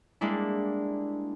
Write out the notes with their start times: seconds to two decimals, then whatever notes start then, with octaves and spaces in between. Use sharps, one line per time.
0.21 G3 G#3 A#3 D4 E4